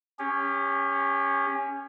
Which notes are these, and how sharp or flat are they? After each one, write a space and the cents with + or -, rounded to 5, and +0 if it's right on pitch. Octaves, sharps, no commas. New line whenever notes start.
C#4 +0 G4 +35